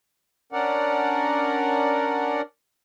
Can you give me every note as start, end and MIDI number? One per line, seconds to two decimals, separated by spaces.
0.53 2.41 61
0.53 2.41 62
0.53 2.41 70
0.53 2.41 74
0.53 2.41 78